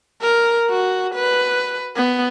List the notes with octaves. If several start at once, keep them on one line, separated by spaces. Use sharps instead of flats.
A#4
F#4
B4
B3